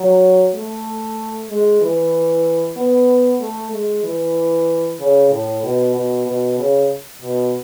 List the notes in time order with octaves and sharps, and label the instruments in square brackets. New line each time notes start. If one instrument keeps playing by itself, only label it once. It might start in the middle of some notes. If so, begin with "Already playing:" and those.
Already playing: [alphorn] F#3
A3
G#3
E3
B3
A3
G#3
E3
C#3
A2
B2
B2
B2
C#3
B2